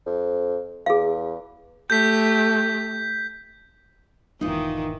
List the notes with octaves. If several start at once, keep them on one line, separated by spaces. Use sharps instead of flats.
F2
E2 G#4 F5
A3 G4 G6 B6
E1 G#2 D#3 E3 D#4 F4